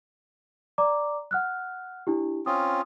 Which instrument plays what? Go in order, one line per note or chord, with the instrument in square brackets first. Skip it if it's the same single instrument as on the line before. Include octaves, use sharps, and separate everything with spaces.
[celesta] D5 A#5 D6
F#5 F6 F#6
D4 E4 G4
[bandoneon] C4 C#4 F4 [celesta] D#6